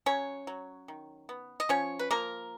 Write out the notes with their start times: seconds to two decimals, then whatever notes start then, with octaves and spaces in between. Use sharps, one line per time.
0.06 F#3 C#4 C#5
0.47 F#3
0.88 D#3
1.29 B3
1.60 D#5
1.69 F3 C#4 C#5
1.99 B4
2.11 F3 A#3 A#4